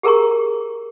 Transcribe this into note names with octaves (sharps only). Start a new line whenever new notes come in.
G4 G#4 A#4 A#5 C#6